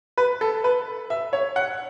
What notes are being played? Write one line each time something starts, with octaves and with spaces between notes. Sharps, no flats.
B4
A4
B4
E5
C#5
F#5